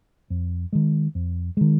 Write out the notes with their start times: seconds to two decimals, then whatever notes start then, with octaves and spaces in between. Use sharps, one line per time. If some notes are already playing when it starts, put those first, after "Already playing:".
0.30 F2
0.73 D#3 G#3
1.15 F2
1.57 D#3 G#3